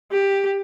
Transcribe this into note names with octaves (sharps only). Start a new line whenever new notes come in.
G4